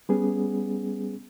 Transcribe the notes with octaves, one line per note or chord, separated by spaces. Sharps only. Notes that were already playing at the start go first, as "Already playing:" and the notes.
G3 B3 C#4 G#4